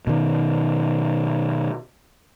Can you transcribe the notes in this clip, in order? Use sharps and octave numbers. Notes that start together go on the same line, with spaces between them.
B2 D#3